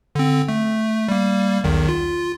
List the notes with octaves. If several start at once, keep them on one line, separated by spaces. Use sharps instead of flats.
D3 C4
A3
G3 A#3
B1 E2 D#3
F4